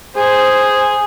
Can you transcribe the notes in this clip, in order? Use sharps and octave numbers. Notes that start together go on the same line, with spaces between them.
G#4 C5